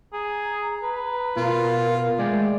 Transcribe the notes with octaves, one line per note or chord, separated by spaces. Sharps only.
G#4 A#5
B4
B2 F4 A#4
G#3 A3 G#4 D5 G5